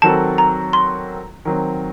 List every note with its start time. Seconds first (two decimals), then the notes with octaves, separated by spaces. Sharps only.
0.02 D#3 F#3 C4 F#4 A4 A5
0.38 A#5
0.73 C6
1.45 D#3 F#3 C4